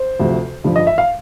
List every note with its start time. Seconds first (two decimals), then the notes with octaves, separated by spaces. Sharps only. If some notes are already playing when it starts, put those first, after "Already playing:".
Already playing: C5
0.20 D2 C3 F3
0.64 G2 D3 F3
0.76 D#5
0.87 E5
0.98 F5